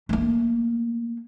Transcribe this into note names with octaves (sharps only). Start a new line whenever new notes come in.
A3 A#3